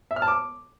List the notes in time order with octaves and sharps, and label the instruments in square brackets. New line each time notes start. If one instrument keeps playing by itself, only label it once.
[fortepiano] E5
F6
A5
D6